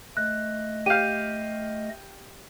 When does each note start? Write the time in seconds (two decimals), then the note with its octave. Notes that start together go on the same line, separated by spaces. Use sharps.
0.17 A3 D#5 F#6
0.86 G4 F5 G6 D#7